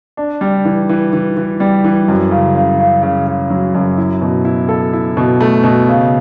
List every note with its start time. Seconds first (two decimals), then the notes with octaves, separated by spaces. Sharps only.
0.17 D4
0.41 G3
0.65 E3
0.89 E3
1.13 E3
1.37 E3
1.60 G3
1.84 E3
2.08 F#2
2.31 C#3
2.55 C#3
2.79 C#3
3.03 C#3
3.27 C#3
3.50 F#3
3.75 F#2
3.97 E4
4.22 B2
4.45 E4
4.69 A4
4.93 E4
5.17 B2
5.41 A3
5.64 B2
5.88 C#3